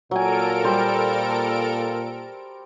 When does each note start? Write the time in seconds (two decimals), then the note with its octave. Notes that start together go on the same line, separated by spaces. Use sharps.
0.11 A#2 F#3 A4 A#4 G#5 D7
0.64 G3 C5